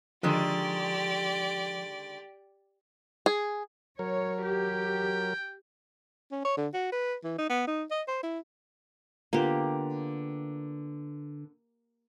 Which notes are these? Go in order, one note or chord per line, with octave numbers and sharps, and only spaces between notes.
D3 D#3 F3 G#3 G4 D5
G#4
F#3 A#4 C#5
G4 G5
C#4
C#5
D3
F#4
B4
E3
D#4
B3
D#4
D#5
C5
E4
D3 A#3 B3 F4 G4